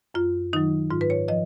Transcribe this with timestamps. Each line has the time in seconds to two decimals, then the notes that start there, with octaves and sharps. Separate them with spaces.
0.14 F#2 F4
0.53 D#3 F#3 D#4
0.91 G#2 F4
1.01 B4
1.10 C#5
1.28 F3 D#5